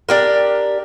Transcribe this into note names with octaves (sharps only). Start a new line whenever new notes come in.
D4 G4 A#4